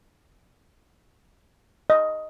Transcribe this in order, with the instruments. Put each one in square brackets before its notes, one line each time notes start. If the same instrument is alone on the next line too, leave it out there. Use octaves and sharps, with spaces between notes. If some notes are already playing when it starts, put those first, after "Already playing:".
[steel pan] D#5